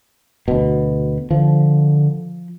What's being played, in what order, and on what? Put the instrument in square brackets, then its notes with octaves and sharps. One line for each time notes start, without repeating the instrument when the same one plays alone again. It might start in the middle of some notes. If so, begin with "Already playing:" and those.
[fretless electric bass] D2 B2
[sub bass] D3 [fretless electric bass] F3